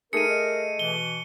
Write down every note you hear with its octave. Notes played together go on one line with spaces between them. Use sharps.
A3 D#4 G#4 A#4 C#7 D#7
D#5
B2 E3 G7